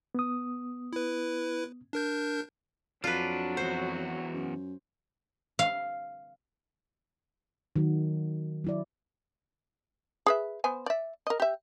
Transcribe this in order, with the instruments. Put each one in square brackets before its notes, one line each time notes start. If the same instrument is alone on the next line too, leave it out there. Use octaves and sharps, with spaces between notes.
[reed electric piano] B3 D#6
[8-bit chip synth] E4 B4
D4 A#4 G6
[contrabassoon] F2 [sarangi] F#3 [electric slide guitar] D4 [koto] F4 B4
[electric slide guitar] E2 F#4 [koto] C5
[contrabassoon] F#2
[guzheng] F5
[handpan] D#3 F#3 F#4
F#3 E4 D5
[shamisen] G#4 B4 E5
B3 C5 G#5
D5 E5
A#4 D#5
G4 E5